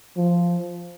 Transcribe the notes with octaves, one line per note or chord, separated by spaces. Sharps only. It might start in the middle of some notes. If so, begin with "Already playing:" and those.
F3